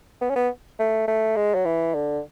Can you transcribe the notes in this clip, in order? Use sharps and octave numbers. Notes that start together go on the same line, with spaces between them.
B3
C#4
B3
A3
A3
G#3
F#3
E3
D3